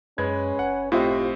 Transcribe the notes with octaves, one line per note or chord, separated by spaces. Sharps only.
F#2 G#3 C#4 B4 G#6
F#1 F#5
A2 C4 F4 G4 C5 D#5 E5